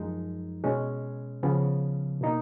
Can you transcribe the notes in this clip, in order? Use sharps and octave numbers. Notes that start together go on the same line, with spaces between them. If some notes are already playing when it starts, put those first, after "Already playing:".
Already playing: F#2 F3 G#3 D#4
B2 G#3 C#4
C#3 F3 B3
B2 A#3 D#4